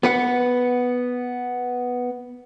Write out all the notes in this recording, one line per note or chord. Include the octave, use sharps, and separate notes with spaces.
B3 B4 F#5